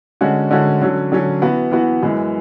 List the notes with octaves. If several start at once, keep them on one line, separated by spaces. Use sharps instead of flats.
D3 G#3 C#4 F#4
D3 G#3 C#4 F#4
D3 F#3 C#4
D3 F#3 C#4
E3 B3 F#4
E3 B3 F#4
F#2 E3 G#3